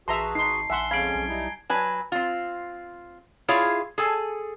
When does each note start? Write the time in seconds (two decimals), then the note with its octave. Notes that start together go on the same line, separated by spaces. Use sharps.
0.08 A1 F#4 G#4 B4 E5 A5 A#5 C6
0.35 G#1 D#4 C6 C7
0.70 A#1 E5 F#5 G#5 C6 G7
0.91 F2 G#3 C#4 F5 B5 G#6 D7
1.15 B1
1.28 G3 D#4 E4
1.70 F#3 B4 G#5
2.12 C4 F4
3.48 E4 F4 G#4 C#5 E5 F5
3.98 G#4 A4 G#5